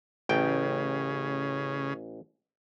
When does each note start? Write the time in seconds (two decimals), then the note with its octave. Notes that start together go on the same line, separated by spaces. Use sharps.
0.29 A1 C#3 G5